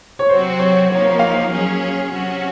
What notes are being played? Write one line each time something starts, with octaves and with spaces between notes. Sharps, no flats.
C#5
C3 F#3 C4 F#4 C5
C#5
F3 A#3 D#4 C#5
F5
F#3 C#4 G#4
C3 F#3 C#4 F#4